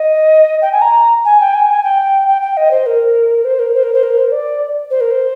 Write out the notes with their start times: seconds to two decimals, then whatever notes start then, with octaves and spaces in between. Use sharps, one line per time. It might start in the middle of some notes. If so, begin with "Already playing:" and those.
Already playing: D#5
0.62 G5
0.72 G#5
0.81 A#5
1.25 G#5
1.41 G5
1.54 G#5
1.70 G#5
1.83 G5
2.28 G5
2.42 G5
2.57 D#5
2.71 C5
2.86 A#4
3.44 C5
3.59 A#4
3.74 C5
3.83 A#4
3.94 C5
4.03 A#4
4.18 C5
4.32 D5
4.90 C5
5.00 A#4
5.11 C5